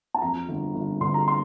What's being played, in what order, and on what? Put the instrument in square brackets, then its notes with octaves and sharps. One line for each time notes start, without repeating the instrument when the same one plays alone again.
[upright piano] A5
F2 A#5
G1
G1
D3 C6
A#5
C6